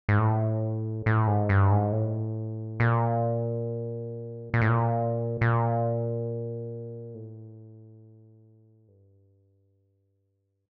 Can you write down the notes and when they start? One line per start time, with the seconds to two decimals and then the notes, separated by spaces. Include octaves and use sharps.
0.09 G#2
0.19 A2
1.06 A2
1.27 G#2
1.49 G2
1.71 G#2
1.92 A2
2.80 A#2
4.54 A#2
4.62 A2
4.69 A#2
5.41 A#2
7.14 A2
8.88 G2